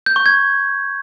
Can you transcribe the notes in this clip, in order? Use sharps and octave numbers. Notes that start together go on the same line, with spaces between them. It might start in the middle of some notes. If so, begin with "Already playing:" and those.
G6
C#6
G#6